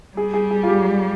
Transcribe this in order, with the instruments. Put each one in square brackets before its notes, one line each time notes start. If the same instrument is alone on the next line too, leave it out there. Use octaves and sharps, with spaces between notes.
[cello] G3 [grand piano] G#4
[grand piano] G#4
G#4
F4
G4